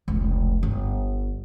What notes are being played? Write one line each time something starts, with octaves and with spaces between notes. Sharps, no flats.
F1 C#2
G1